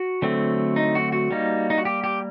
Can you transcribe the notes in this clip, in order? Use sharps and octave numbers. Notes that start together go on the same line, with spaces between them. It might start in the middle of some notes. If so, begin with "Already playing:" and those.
Already playing: F#4
D3 F#3 A3 C4
D#4
F#4
F#4
G3 A#3 D#4
D#4
F#4
G4
G4